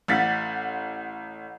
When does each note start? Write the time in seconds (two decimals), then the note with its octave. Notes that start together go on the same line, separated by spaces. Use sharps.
0.08 A1 F5 F#5 A6 B6